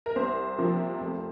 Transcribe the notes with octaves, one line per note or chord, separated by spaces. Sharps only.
A#4
C2 C5
C3 F3 A#3
F1